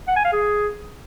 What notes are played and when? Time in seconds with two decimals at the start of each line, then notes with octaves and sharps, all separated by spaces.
0.08 F#5
0.16 G#5
0.24 F5
0.33 G#4